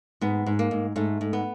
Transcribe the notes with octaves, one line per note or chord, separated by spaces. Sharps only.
G#2 B3
G#2
A#3
G#2
G#2 A3
G#2
B3